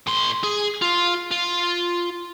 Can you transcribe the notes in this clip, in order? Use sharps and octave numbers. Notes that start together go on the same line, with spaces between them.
A2 C6
G#4
F4
F4